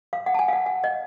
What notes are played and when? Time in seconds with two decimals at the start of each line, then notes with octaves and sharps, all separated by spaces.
0.13 F5
0.26 F#5
0.34 A5
0.39 G#5
0.48 F5
0.53 F#5
0.66 F#5
0.84 D#5